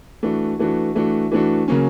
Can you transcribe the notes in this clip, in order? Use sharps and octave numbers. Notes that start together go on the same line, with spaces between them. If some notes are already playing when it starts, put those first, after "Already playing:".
E3 A3 D4 F#4
E3 A3 D4 F#4
E3 A3 D4 F#4
E3 A3 D4 F#4
C#3 F#3 A#3 C#4